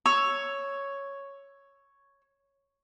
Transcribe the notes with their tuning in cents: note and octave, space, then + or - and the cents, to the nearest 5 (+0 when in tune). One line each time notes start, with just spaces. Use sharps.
C#5 +0 E6 +5